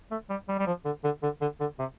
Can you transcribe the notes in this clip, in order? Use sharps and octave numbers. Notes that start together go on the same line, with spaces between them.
A3
G3
G3
G3
F3
D3
D3
D3
D3
D3
C3